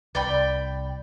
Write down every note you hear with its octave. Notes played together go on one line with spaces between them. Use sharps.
C2 D5 G5 B5